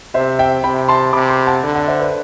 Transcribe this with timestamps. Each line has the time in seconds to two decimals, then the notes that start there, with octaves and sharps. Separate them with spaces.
0.14 C3 C5 E5
0.39 E5 G5
0.64 C3 G5 B5
0.88 A5 C6
1.13 C3 B5 D6
1.29 A5 C6
1.47 F#5 A5
1.63 D3
1.75 D5 F#5
1.88 C5 E5
2.00 B4 D5